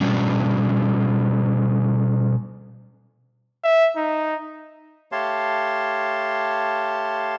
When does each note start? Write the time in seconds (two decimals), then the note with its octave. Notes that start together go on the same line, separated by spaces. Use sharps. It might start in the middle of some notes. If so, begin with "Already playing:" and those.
0.01 B2 G3 C#4 D4
3.64 E5
3.97 D#4
5.12 A3 G4 C#5 F5 A5 C6